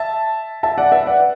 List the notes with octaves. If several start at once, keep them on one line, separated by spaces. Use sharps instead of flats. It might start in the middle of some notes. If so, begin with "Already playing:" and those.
Already playing: E5 A5
E5 A5
D5 F#5
B4 E5
D5 F#5